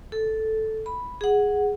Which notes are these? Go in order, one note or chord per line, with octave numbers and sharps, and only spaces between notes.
A4
B5
G#4 F#5